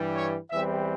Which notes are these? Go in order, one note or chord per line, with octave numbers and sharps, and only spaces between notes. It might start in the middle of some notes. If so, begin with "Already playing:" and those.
Already playing: G2 E3 G3
C#5
E2 E3 G3 C4 E5